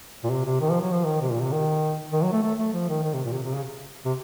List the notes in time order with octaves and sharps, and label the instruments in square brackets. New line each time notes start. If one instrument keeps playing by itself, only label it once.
[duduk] A#2
C3
C3
D#3
F3
F#3
F3
D#3
C3
A#2
C3
D#3
D#3
F#3
A3
A3
A3
F3
D#3
D#3
C3
A#2
C3
C3
C#3
C3